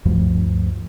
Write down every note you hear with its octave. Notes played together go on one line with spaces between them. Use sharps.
D2 G2 F3 A3